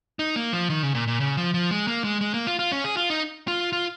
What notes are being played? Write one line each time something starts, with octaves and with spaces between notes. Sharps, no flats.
D#4
A#3
F3
D#3
C#3
A#2
A#2
C#3
F3
F3
G#3
A#3
G#3
G#3
A#3
F4
F4
C#4
G#4
F4
D#4
F4
F4